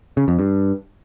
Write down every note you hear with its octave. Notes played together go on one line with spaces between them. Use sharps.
C#3
F2
G2